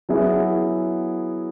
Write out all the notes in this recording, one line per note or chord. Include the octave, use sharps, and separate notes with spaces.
F#3 B3 E4 G#4